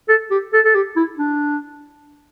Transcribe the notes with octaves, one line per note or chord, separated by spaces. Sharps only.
A4
G4
A4
A4
G4
E4
D4